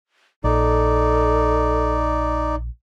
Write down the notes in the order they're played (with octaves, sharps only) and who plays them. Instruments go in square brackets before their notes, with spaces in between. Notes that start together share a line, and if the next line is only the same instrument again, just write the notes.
[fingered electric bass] A#1 [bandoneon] D#4 D5 [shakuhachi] A4